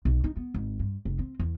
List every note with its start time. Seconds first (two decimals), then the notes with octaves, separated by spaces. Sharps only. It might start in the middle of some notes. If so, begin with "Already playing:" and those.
0.05 B1
0.24 D#4
0.37 B3
0.54 G#1
0.79 G2
1.05 F1
1.19 C4
1.39 E2